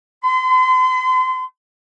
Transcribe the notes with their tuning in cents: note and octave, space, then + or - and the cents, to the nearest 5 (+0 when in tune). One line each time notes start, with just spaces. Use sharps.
C6 -40